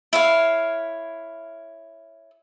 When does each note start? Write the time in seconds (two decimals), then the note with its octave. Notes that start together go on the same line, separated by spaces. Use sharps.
0.13 E4 C#5 F5